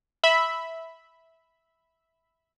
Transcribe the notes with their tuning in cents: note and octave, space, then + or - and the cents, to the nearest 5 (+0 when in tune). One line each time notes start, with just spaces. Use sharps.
E5 -10 B5 +5